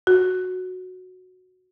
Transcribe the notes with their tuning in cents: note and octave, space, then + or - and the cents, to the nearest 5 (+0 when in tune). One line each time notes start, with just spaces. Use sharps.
F#4 -5